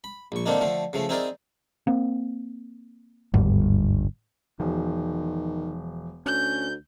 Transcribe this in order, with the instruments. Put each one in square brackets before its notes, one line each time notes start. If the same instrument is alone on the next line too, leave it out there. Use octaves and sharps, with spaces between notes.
[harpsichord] B5
A#1 C#6
D3 D#3 A#3 C4 D4 D#4
D3 F3 A3
C#3 F3 A3
C4 D#4 E4 G#4 A#4 D5
[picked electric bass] A#3 C4
[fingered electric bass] G1 [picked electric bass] D#2 G#2 G3
[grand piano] E1 [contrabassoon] D#3 [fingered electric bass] F3
[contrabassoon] D2 [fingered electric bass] C#4 [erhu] G6